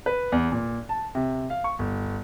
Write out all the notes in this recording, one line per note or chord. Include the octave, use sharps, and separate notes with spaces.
B4
E2
A#2
A5
C3
F5
C#6
G1